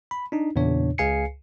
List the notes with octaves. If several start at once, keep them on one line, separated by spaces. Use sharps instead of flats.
B5
D4 D#4
E2 A#2 C#3 D4 C#5
C#2 G#4 F5 G#5 C7 C#7